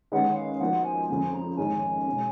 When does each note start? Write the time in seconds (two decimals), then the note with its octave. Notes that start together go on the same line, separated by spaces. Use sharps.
0.12 D#3 G#3 C#4 G#4 B4 F#5
0.36 F5
0.60 F3 B3 D#4 F#4 A#4 F#5
0.84 G#5
1.09 F2 C#3 F3 G#5
1.34 A#5
1.57 G#2 D#3 G#3 C#4 G#4 G#5
2.06 B2 G#3 C#4